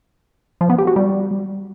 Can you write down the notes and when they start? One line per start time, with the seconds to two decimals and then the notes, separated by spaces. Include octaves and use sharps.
0.61 F3
0.70 B3
0.78 G4
0.87 F#4
0.96 G3